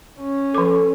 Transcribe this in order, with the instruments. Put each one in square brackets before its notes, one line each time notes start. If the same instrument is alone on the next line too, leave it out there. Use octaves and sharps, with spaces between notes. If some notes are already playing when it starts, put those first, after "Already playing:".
[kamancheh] C#4
[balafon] F3 D6 [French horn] A4